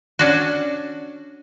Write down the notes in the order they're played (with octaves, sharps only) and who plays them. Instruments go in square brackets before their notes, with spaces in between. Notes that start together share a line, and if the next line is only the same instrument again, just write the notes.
[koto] C#4 D4 F#4